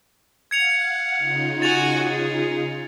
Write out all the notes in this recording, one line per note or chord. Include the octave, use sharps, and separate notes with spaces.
F5 F#5 G#6 C#7 F7
C#3 D#4 F4
F#4 G#5 A6 F7
G#4